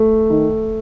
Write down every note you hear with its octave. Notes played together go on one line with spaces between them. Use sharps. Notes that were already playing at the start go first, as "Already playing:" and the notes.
Already playing: A3
D#3